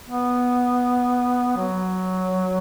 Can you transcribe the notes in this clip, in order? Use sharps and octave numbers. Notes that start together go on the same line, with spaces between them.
B3
F#3